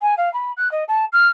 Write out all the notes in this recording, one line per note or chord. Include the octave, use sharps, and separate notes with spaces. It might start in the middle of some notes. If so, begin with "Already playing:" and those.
G#5
F5
B5
F#6
D#5
A5
F6